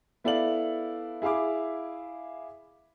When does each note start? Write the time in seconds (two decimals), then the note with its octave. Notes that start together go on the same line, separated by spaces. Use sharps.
0.24 B3 E4 A4 D5 F5 F#7
1.22 E4 G#4 F5 B5 D6